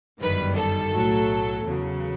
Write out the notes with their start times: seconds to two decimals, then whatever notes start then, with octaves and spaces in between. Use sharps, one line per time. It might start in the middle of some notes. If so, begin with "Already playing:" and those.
0.20 G1 F#2 D#3 G3 B4
0.56 A4
0.92 B1 A2 F#3
1.63 E2 C#3 F#3